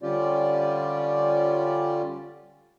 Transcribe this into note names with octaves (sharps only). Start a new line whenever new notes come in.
D3 G3 C#4 F4 G4 D5